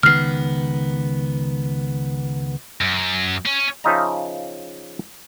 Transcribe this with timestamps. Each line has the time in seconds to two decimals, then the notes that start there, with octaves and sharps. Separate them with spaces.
0.03 C#2 D#3 B3 F6 C7
2.81 F#2
3.45 C#4
3.84 C#3 F3 D#4 D#5 E5 A#5